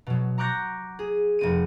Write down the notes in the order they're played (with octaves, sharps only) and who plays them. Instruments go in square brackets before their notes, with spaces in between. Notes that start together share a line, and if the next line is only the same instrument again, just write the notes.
[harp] B2 F#3
A#5 C#6 D6 F#6 G6 A#6
G#4
F1 C4 D#7